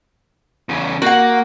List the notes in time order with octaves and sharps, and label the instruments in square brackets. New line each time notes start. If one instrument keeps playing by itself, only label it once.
[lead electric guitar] E2 C#3
[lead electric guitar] A#3 [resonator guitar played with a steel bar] F#4 F#5